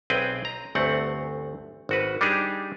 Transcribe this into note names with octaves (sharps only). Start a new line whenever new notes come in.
B1 C4 G#4 B4 G5
A#5
G1 D2 A3 C4 F#5
G#1 F#4 B4
G3 D4 D#4 G4 G#4